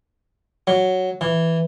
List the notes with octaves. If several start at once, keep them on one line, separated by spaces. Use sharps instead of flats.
F#3
E3